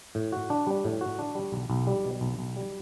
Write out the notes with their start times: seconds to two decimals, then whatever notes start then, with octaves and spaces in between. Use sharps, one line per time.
0.15 A2
0.32 F#4
0.50 D4
0.67 G3
0.85 A2
1.01 F#4
1.19 D4
1.35 G3
1.52 B1
1.70 B1
1.87 G3
2.05 B2
2.21 B1
2.39 B1
2.56 G3